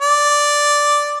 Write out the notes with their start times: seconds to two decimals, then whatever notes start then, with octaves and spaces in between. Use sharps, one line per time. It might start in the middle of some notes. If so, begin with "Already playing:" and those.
0.01 D5